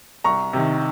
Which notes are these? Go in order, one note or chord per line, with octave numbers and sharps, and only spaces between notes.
C2 A#5 C#6
C3 D#3